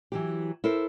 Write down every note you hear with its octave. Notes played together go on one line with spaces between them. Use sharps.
E3 F#3 G4
E4 A4 A#4 C5